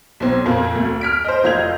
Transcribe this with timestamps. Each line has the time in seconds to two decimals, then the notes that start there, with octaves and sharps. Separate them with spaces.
0.20 B1 C4
0.45 F2 A#2 A#3
0.75 D2
1.01 F6 B6 D7
1.24 C5 D#5
1.44 F1 F4 D#5 G6 G#6 F7